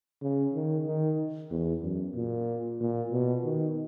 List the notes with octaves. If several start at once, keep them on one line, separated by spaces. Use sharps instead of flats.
C#3
D#3
D#3
E2
F#2
A#2
A#2
B2
D#3